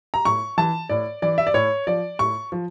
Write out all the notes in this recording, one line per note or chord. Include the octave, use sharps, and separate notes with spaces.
A#5
A2 C#6
E3 A5
A2 D5
E3 D5
E5
D5
A2 C#5
F3 D5
A2 C#6
F3